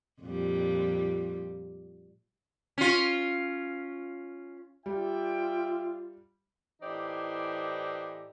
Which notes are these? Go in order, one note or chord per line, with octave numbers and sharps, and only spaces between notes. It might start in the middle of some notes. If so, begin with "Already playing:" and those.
F2 A#2 G3
C#4 F4
G3 F4 D5 E5 G5
A2 E3 D#4 G4 C5 D5